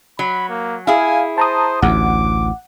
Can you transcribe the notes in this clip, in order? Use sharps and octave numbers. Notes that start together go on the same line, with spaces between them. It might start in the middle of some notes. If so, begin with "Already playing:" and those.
F#3 B5
A#3
E4 G#4 F5 G#5
C5 A5 A#5 D#6
A1 D2 F#5 D6